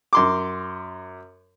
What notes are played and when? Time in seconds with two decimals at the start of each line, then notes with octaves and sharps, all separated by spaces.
0.13 F#2 C6 D6